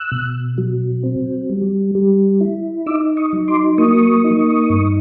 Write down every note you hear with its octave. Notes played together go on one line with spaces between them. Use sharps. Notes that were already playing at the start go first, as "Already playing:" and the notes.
Already playing: E6 F#6
B2
F#3
C4
G3
G3
E4
D#4 D6 E6
C#6 D#6
F#3
C6 D6
A#3 C#6 D#6
D#4
G2